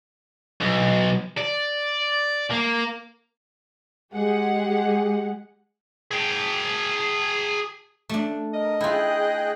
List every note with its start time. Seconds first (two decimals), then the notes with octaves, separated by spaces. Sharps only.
0.61 B1
1.37 D5
2.51 A#3
4.14 G#3 G4 G#4 F#5
6.11 G#4 G5
8.09 A3 D4
8.54 A#4 D#5
8.81 E4 F4 G#4 G5 F#6